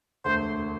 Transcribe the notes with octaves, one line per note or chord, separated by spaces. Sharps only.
E1 D2 D3 A3 C5